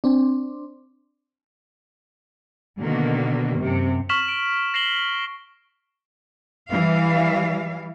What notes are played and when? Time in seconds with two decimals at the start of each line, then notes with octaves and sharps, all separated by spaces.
0.04 C4 D4
2.79 B2 D3 D#3 A#3
3.58 F#2 C3
4.09 C#6 F6 B6 E7 F#7
4.28 D7
4.74 A#6 C7 E7 F#7 G7
6.71 E3 G3 F5